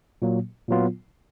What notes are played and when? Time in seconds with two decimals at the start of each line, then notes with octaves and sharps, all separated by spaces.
0.22 A#2 F#3 A#3
0.68 A#2 F#3 B3 F4